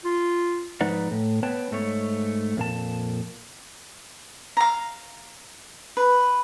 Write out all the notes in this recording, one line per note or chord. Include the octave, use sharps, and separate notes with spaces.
F4
G#2 F3 D#4 B4 D5 F#5
A2
B3 B4 C#5 G5 A5
G#2 A3 C#5
F2 A#2 A5
F5 A#5
B4